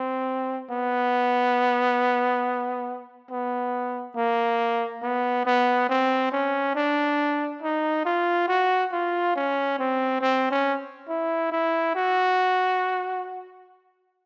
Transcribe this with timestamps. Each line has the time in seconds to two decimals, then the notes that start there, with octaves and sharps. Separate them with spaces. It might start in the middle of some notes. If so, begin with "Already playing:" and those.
Already playing: C4
0.70 B3
3.30 B3
4.15 A#3
5.02 B3
5.45 B3
5.89 C4
6.32 C#4
6.75 D4
7.62 D#4
8.05 F4
8.48 F#4
8.92 F4
9.35 C#4
9.79 C4
10.21 C4
10.50 C#4
11.08 E4
11.51 E4
11.95 F#4